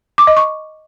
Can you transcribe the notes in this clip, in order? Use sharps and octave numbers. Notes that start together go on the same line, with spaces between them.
D6
D#5
C#6